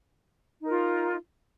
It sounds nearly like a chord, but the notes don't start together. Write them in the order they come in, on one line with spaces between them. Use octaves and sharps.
D#4 A#4 F4